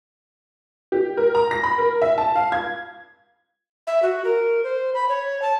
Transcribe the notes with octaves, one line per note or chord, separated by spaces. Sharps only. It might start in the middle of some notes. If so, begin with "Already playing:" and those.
G4
A#4
A#5
A#6
B5
A#4
E5
A5
F5
G#6
E5
F#4
A#4
C5
B5
C#5
A5